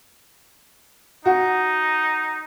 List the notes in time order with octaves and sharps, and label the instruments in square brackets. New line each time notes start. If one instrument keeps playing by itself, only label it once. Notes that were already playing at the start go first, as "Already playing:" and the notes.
[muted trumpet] D#4 [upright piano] F#4